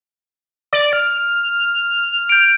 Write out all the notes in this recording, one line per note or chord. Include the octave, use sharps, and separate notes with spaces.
D5
F6
G6 D7